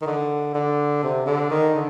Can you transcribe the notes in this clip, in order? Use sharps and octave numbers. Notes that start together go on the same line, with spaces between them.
D#3
D3
D3
C3
D3
D#3
D3